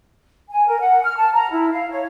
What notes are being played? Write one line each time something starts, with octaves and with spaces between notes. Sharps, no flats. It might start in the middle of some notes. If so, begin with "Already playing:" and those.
G#5
A#4
F#5
F6
A5
A#5
E4
F5
C#5